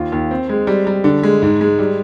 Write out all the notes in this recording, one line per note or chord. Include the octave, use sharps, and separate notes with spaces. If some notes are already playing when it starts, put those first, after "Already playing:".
Already playing: D#2 F4
D#2
C4
G#3
G3
G3
D3
G#3
G#2
G#3
G3